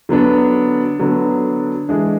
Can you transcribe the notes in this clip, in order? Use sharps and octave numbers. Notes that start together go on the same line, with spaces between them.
D3 F#3 B3 D4
D3 F#3 B3 D4
E3 G#3 D4 G#4